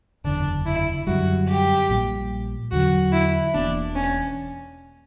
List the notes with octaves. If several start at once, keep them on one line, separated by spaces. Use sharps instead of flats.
F#1 E2 D3 D4
E4
F#2 D3 G3 F#4
G4
A#1 A#2 G3
E2 D3 F#3 F#4
E4
E1 E2 B2 A#3 D4
C#4